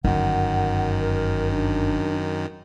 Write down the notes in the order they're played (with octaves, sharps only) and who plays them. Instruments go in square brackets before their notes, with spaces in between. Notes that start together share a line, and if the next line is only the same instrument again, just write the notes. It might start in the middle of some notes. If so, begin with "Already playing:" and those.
[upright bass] G1 [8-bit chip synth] F#2 D#3 [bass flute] F#5
[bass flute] A#4
D4